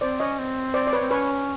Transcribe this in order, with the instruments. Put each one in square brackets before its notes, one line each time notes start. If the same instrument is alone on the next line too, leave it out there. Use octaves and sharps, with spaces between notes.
[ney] C4 [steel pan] C5 D5
[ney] C#4 [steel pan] C#5 D#5
[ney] C4
[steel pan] C5 D5
D5
B4 C#5
[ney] C4
[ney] C#4 [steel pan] B4 C#5